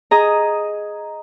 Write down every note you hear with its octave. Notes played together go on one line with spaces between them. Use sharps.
G#4 D#5 A#5